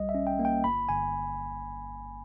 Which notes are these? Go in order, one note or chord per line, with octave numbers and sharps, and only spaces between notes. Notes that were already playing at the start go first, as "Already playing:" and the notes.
Already playing: B1 G3 D#5
E5
C#4
G5
A#3
G5
G1 B5
G1 G#5